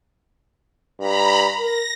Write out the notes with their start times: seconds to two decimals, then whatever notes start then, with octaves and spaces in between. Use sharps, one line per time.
0.99 G2 A#5 B5
1.58 A#4 A#6